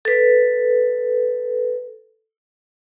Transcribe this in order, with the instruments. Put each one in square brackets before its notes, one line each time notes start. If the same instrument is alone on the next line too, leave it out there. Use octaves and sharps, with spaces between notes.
[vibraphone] A4 B4